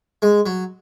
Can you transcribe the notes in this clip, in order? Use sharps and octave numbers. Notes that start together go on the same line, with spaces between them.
G#3
F#3